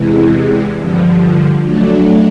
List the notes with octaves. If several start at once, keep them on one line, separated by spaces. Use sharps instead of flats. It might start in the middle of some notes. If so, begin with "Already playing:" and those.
Already playing: E2 C3 E3 G#3
G2 D3 F3
F#3 A3 D4